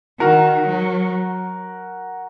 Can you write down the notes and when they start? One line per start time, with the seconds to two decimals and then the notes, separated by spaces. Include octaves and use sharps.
0.20 D#3 F#4 A#4
0.68 F#3